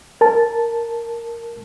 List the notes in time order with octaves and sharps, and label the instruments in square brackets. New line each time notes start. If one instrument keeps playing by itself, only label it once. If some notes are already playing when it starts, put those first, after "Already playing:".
[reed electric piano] A#4 A5